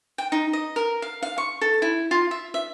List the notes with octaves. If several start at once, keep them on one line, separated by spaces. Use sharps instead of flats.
G5
D#4
D#5
A#4
F5
F5
C#6
A4
E4
F4
E5
E5